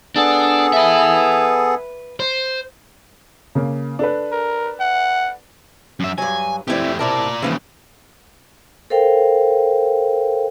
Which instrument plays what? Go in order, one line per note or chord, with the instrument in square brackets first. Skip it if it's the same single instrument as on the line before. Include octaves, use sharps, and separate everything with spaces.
[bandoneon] B3 G#4 A4 [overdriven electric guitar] D4
[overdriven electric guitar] B4 E5
C5
[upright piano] C#3 A#3
D4 A4 B4
[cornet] A#4
F#5
[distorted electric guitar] F#2 E5
[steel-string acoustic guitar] G2 F#3 [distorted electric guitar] G#5
[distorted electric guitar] A3 G4 [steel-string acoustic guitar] C4 E4 D5
[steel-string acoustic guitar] C3 E4 A5 [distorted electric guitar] A#4 D5
[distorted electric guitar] D#2 C#3 [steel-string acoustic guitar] E3 F3 E4
[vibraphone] A4 A#4 C5 F5 G5